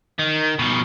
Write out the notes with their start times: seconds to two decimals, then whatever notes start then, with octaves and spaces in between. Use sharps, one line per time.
0.19 D#3
0.59 B2 F3